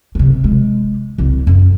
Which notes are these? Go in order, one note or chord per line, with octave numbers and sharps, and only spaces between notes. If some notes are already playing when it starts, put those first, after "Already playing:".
C3 F#3
G#3
C2 E4
F#2